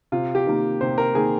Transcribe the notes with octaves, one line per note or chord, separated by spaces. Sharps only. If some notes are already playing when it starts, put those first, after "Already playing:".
C3 F4
G4
D#3 A#3
C3 C5
A#4
D#3 A#3 G#4